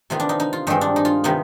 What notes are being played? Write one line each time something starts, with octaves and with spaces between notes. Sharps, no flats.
C3 D#3 B3 F4
D4
D#4
D#4
F4
G2 D#3 G#3 C4 D#4
D4
D#4
F4
C3 D#3 B3 D#4